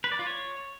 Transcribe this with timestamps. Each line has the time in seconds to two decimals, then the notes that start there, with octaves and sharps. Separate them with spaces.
0.04 B4
0.12 D5
0.19 F4
0.27 C#5